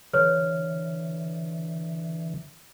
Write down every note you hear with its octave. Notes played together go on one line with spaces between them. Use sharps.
D3 E3 C#5 F6